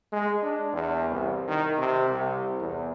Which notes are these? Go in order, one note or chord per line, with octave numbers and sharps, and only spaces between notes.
G#3
D4
E2
C2
D#3
C3
C2
E2